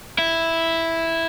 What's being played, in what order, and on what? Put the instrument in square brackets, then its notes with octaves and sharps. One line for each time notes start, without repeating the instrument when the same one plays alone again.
[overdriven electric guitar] E4